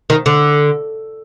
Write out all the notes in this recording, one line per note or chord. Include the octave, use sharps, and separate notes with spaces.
D#3
D3